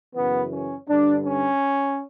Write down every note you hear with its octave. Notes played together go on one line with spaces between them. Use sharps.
F#2 C#3 E3 B3
C#4
G2 D3 D4
C#4